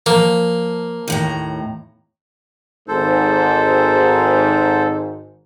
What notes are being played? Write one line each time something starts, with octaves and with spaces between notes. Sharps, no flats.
F3 A#3
D#2 A2 A#5
G#1 G#2 A4 C5